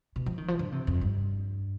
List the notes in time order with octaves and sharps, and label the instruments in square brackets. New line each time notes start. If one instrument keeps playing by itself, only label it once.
[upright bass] B2
F3
D#3
F3
D3
C3
F2
G2